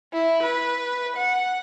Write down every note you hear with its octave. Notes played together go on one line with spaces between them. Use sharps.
E4
B4
F#5